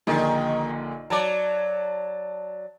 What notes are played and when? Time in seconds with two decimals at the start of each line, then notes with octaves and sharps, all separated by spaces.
0.07 A#1 A#2 D3 D#3
1.10 F#3 D5 A5